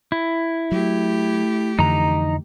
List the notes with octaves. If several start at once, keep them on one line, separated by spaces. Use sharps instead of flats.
E4
F#3 A3 G4
F2 D3 E3 D#4 A#5